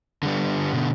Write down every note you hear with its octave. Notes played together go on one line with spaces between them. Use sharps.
D3 G3 B3
B2 D3